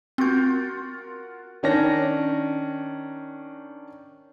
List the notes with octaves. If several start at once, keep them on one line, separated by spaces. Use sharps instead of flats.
C4 F4 F#4 A#4 G6
D#3 C#4 D4 A#6